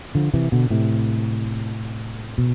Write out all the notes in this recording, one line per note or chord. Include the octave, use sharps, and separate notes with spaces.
D3 F3
C3 E3
B2 D3
A2 C3
B2